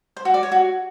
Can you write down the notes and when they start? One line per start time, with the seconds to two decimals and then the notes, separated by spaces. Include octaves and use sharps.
0.16 C5
0.25 F#4
0.34 D5
0.43 C#5
0.52 F#4